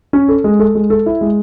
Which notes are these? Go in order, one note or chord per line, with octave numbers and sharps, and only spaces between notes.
C#4
A4
G#3
A4
G#3
A4
E4
G#3